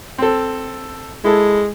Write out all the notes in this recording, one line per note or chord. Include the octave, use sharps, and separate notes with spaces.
C4 A4
G#3 E4 A4